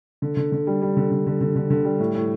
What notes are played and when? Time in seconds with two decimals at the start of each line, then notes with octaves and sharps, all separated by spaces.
0.22 D3
0.37 D3
0.52 D3
0.67 G3
0.82 G3
0.97 D3
1.11 D3
1.27 D3
1.41 D3
1.56 D3
1.70 D3
1.85 G3
2.00 A2
2.15 A2